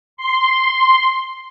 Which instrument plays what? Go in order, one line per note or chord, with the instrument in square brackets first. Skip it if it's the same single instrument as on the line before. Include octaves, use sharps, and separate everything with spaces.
[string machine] C6